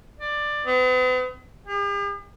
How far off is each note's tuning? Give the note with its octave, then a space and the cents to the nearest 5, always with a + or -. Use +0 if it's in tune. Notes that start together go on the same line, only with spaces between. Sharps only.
D5 +15
B3 +45
G4 +45